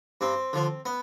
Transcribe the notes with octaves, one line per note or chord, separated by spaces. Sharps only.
G2 C4
D3 F3
B3